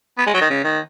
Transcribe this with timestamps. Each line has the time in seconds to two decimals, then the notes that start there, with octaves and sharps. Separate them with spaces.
0.18 B3
0.27 G#3
0.34 F#3
0.41 D#3
0.50 C#3
0.64 D#3